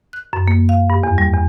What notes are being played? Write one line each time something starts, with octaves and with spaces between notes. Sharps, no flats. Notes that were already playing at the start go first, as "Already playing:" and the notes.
F#6
F#2
A#3
F5
G2
E2
G3
E2